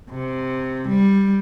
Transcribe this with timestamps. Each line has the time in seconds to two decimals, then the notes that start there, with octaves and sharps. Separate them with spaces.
0.12 C3
0.89 G3